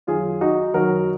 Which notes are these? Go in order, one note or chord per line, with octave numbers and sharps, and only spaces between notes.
F#2 D#3 F4 G#4
D#4 F#4
F#2 D#3 F#4 A#4